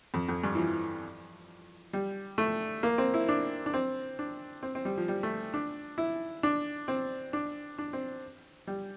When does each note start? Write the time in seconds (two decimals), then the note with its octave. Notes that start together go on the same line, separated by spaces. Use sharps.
0.14 F2
0.29 F2
0.44 G2
0.55 E3
0.58 F3
1.93 G3
2.38 A3
2.83 A#3
2.98 C4
3.14 E4
3.29 D4
3.66 D4
3.74 C4
4.19 D4
4.63 C4
4.75 C4
4.85 G3
4.98 F3
5.08 G3
5.23 A3
5.54 D4
5.98 E4
6.43 D4
6.88 C4
7.33 D4
7.78 D4
7.93 C4
8.67 G3